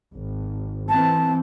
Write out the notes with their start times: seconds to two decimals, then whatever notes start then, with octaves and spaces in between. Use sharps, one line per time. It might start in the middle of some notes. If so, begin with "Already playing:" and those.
0.11 G#1
0.89 E3 C4 A5